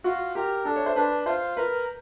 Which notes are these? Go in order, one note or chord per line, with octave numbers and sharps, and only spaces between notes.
F4 F#4
G4 A#4
D4 A4
C#5
C5
D4 B4
F4 C5
A#4 B4